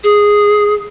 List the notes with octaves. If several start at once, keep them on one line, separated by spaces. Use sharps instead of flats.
G#4